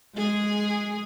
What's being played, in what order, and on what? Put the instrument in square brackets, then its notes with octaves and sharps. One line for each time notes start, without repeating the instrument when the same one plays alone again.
[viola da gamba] G#3 G#4